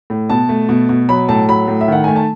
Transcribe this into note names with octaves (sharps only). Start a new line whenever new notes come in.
A2
B2 A5
A3
B2
B2
F#3 B5
A2 A5
F#3 B5
A2
E5
D#3 F#5
A3 G#5
A5